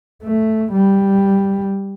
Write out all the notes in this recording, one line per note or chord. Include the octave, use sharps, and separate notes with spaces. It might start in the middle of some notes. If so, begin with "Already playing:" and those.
A3
G3